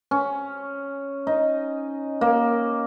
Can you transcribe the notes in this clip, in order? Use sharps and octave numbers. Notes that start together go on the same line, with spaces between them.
C#4
D#4
A#3